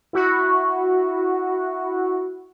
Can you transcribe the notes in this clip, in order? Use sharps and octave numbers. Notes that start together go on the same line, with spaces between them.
E4 F#4